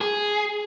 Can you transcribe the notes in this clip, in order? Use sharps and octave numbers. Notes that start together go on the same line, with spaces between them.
G#4